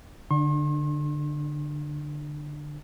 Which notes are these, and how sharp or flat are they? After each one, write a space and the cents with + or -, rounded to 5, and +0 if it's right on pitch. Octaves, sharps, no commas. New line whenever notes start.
D3 +0 D4 +35 C6 +45